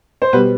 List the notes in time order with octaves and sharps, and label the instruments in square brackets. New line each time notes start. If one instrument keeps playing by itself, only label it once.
[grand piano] C5
[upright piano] B2 G3 B3 [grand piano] B4